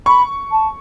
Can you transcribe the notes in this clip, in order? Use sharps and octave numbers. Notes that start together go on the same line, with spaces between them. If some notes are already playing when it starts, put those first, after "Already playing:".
B5 C#6
A5